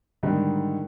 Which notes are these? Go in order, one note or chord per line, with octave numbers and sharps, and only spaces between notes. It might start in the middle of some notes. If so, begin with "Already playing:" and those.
G#2 D3 D#3 G3